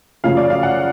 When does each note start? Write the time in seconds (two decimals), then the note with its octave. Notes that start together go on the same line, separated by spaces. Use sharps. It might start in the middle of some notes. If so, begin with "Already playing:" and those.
0.24 F#2 C#3 F3 A3 F5
0.37 D5
0.50 F5
0.63 F#5